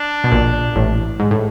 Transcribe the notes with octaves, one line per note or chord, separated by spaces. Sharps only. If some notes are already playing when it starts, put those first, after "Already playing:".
Already playing: D4
B2
A#1 A#2
A1 A2
G#2
A2